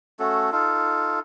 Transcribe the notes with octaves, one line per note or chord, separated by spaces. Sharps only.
A3 C#4 F#4 A4
D#4 F4 A4